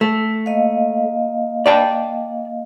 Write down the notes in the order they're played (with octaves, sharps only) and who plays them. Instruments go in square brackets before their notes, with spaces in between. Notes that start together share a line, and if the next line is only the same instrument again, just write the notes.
[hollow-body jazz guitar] A3
[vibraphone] A#3 D#5 F5
[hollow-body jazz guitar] D5 G5 A5